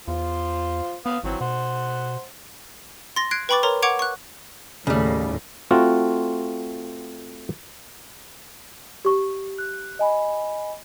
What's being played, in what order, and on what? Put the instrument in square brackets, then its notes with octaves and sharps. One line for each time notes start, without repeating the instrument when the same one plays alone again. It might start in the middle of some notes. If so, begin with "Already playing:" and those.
[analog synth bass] E2 [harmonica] F4 C5
[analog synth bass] B3 [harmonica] B4 F5 D#6
[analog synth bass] G#1 [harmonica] E3 F#3 C4
[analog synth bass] B2 [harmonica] C5 F#5
[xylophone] C6 A6 A#6
F#6 G#6 C7 D7
B4 G5 B5 C#6 D6 A6
A#4 C#5 A#5 C6
F#5 C#6 D6 G#6 D7 F7
C#6 F#6
[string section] D#2 A2 [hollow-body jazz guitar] C#3 G3
[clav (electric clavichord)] A3 C4 F4 F#4
[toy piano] G4 C#6
[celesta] F#6
D#5 G#5 B5